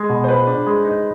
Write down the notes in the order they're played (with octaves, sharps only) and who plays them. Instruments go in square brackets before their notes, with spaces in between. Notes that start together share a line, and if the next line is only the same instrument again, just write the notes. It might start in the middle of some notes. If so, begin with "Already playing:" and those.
Already playing: [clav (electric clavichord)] G#3 [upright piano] G#4
[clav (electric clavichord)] B2
[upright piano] C5
[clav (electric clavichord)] F4 [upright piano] B4
[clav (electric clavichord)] D4
G#3
D#4